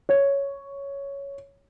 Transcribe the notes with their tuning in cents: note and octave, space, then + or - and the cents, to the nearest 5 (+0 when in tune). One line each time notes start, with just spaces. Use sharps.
C#5 +5